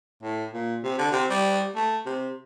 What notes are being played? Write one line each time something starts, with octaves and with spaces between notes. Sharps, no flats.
A2
A#2
C3
D3
C3
G3
A3
C3